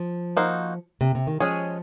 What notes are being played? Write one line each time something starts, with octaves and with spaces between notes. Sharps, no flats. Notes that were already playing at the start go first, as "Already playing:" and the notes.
Already playing: F3
A#3 D#4 F#4 C5
C3
C3
D#3
F3 G#3 C#4 G#4 C#5